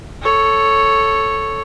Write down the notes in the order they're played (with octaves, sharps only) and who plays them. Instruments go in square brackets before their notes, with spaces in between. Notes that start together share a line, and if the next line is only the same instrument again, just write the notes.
[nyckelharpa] A4 C#5